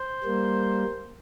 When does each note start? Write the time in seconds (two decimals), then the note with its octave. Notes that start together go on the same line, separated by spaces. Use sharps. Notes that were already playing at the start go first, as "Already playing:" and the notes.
Already playing: C5
0.24 G3 A#3